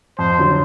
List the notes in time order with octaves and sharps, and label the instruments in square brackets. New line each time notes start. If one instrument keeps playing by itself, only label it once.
[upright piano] F2 [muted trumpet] C5
[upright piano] D3 F#3